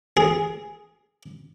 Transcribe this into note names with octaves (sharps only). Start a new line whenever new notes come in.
G#4